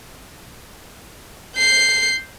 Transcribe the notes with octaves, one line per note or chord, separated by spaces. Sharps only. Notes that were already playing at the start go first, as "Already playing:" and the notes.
G6 C7